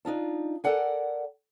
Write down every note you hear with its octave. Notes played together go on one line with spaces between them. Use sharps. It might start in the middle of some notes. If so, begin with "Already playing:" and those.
D4 D#4 F4 A5
A4 A#4 D5 F#5 G#5